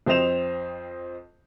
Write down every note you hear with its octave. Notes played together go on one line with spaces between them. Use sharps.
F2 C4 C5 D#5 E7 F7